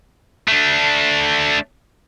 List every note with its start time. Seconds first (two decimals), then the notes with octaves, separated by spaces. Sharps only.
0.48 A3 D4